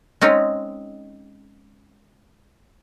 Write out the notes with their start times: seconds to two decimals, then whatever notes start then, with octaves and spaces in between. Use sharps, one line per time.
0.21 G#3 C4 C#4 D#4